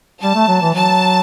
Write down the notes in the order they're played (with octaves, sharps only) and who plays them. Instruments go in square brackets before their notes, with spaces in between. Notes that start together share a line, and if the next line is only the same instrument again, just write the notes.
[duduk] G3 [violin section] A5
[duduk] A3
F#3
E3
[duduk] F#3 [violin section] A5